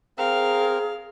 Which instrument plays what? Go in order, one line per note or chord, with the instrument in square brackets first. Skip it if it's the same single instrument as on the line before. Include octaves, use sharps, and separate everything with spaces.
[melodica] C4 A#4 [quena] G#4 [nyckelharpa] F5